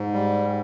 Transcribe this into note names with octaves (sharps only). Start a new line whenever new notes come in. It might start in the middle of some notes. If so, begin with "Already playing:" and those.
Already playing: G#2
G3